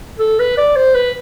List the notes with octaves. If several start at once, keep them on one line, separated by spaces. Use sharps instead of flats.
A4
B4
D5
C5
B4